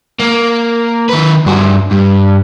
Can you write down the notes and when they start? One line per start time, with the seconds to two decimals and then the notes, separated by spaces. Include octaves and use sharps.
0.19 A#3
1.10 D#3 B4
1.46 G2 F#4
1.91 G2